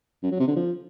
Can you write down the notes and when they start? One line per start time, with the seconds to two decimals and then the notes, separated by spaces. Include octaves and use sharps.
0.23 F#2
0.31 F#3
0.40 C3
0.48 D3
0.56 F3